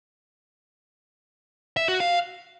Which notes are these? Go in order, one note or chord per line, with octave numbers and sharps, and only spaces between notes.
E5
F#4
F5